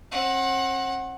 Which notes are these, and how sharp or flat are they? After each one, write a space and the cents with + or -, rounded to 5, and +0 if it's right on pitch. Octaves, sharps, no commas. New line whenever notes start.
C4 +45 F#5 +0